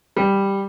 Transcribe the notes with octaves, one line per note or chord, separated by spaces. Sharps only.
G3